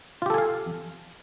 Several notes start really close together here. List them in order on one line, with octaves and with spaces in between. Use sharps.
F4 G4 A4 G#5 F5